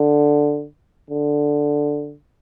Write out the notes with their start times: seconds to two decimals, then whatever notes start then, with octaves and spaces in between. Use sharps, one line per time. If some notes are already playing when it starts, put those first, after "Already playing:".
Already playing: D3
1.10 D3